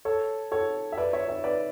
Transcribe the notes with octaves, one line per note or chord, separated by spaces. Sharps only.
A4 C#5
A4 C#5
E5
B4 D5
C#5 E5
C#5 E5
B4 D5